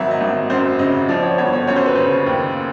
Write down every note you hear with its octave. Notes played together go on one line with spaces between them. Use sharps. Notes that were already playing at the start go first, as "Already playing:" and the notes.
Already playing: G#1 F#3 E5
D#5
G#1
F#2 C5
C#3 D#5
F3 D5
C#5
G1 C#5
C#5
F#2 C#5
C5
B4
C#3 C5
D#2